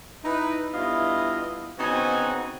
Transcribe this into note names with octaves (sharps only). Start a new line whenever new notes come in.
D#4 E4 B4
G2 B3 E4 F4 D#5
C#3 B3 C4 D#4 F#4 G#5